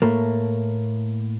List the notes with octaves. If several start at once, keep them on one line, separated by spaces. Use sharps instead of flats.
A2 A3 A#3